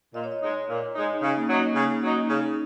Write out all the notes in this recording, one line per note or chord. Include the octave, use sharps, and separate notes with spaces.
A#2 D#5
C#5
D#5
G#3 D#4
A#2
G#3 D#4
D#4
C#3 C#4
A#3
F#3 C#4 D#4
C#3 C#4
F#3 A#3 D#4
D#4
C#3 C#4